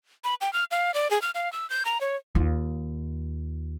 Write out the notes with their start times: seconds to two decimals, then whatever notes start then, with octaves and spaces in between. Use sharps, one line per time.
0.24 B5
0.41 G5
0.53 F6
0.71 F5
0.94 D5
1.11 G#4
1.22 F6
1.35 F5
1.53 E6
1.70 G6
1.85 A#5
2.01 C#5
2.35 D#2 F4